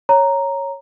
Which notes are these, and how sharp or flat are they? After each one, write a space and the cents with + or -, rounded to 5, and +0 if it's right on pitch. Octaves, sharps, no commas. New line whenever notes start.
C#5 -5 A#5 +0